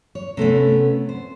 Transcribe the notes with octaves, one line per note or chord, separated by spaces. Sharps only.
C#5
C3 A3 B3 C#4
C5